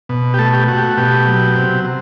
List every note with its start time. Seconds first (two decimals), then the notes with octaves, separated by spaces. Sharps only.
0.09 B2
0.34 G4
0.39 A3 A4
0.53 G4
0.68 A3 F#4
0.77 G4
0.83 F#4
0.97 B2 G4
1.27 F#3
1.56 C3
1.85 C3